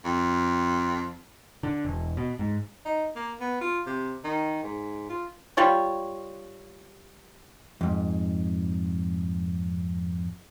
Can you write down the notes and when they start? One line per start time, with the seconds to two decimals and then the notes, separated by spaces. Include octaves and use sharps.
0.05 F2
1.63 D3
1.85 E1
2.17 B2
2.39 G#2
2.85 D#4
3.16 A#3
3.40 B3
3.61 F4
3.86 C3
4.24 D#3
4.63 G#2
5.09 F4
5.57 G3 F4 C#5
7.81 F2 G#2